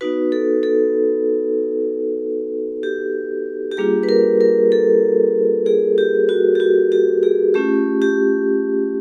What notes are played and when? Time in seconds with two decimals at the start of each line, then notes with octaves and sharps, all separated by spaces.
0.01 B3 D#4 F#4 B4
0.32 A4
0.63 A4
2.83 G4
3.72 G4
3.77 G3 A#3 D4 F4 G#4
4.03 B4
4.09 A#4
4.41 A#4
4.72 A4
5.66 G#4
5.98 G4
6.29 F#4
6.55 G4
6.60 F#4
6.92 G4
7.23 G#4
7.54 A3 C#4 F4 G4
8.02 G4